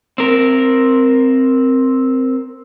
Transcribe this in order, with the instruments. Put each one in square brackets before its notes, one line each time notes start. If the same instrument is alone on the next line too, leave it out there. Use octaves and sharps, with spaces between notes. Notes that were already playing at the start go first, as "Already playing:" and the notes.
[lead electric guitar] C4 A#4